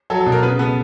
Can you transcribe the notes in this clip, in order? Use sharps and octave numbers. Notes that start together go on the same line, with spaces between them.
F#3 A4
A4
B2
A#4
C#3 B4
B3 A4